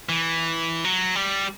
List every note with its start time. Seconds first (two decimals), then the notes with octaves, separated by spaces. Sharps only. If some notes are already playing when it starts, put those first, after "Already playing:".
0.09 E3
0.84 F#3
1.15 G3